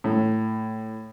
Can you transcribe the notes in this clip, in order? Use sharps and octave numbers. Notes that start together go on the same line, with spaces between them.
A2